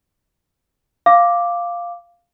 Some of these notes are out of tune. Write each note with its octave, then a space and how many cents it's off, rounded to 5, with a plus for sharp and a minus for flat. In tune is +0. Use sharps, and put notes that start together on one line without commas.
F5 +0 D6 +0